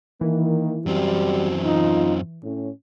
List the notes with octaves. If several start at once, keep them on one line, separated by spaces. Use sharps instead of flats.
D#3 E3 A#3
F#2 G3 C4 F#4
D#4 F4
A2 C#4